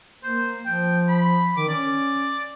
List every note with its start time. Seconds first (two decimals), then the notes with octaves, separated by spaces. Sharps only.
0.23 A#3 C5
0.65 F3 G5
1.08 B5
1.57 D#3 D6
1.68 C#4 D5